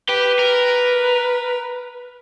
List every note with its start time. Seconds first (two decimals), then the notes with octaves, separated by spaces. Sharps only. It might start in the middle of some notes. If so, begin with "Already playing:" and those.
0.09 G4 B4
0.39 A#4